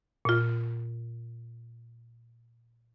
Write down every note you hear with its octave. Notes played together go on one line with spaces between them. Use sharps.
A#2 F4